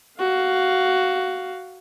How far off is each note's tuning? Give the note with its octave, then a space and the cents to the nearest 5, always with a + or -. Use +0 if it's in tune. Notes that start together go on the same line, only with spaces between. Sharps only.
F#4 +10 F5 +0